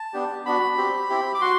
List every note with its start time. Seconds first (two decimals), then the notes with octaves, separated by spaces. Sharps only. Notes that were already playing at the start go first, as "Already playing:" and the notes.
Already playing: A5
0.13 B3 D4 G4
0.45 B3 D4 F#4 B5
0.77 C4 G4
1.09 C4 E4 G4
1.34 D6
1.41 F#4 C6